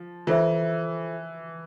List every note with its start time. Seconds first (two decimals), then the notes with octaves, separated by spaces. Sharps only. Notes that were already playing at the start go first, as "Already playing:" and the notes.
Already playing: F3
0.27 E3 F4 A4 C5 E5